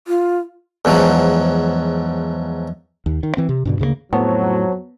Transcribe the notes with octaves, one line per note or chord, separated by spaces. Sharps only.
F4
E2 G#2 F3 F#3
D#2
D#3
E3 C4
C3
G2 B2 D3
D2 C#3 G3 A#3
F2 A2 F#3 B3 C5 C#5 A5